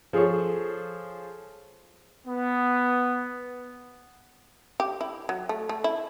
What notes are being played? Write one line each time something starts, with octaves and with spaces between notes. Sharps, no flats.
F3 G#4 A4 C#5 C#6
B3
G4
E4
F#3
A3
A3
E4